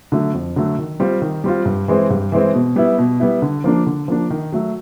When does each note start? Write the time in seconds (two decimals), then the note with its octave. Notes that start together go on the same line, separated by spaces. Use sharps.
0.12 D3 F#3 A3
0.34 F2
0.56 D3 F#3 A3
0.79 D#3
1.00 G3 C4 F4
1.22 D#3
1.44 G3 C4 F4
1.65 G2
1.88 E3 G#3 C4
2.10 G2
2.32 E3 G#3 C4
2.54 B2
2.76 G3 B3 E4
2.98 B2
3.20 G3 B3 E4
3.42 D3
3.64 F3 A#3 D4
3.86 D3
4.08 F3 A#3 D4
4.30 D#3
4.52 F#3 A3